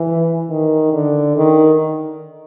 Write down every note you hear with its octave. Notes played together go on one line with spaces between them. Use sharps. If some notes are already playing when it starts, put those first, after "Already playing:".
Already playing: E3
D#3
D3
D#3